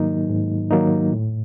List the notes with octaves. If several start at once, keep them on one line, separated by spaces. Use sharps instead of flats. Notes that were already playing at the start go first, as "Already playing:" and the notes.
Already playing: G#2 D#3 F#3 A#3 D#4
G#2
D#3 F#3 A#3 D#4
A2